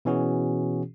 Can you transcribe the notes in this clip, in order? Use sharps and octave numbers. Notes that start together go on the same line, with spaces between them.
B2 E3 C#4 F#4 G#4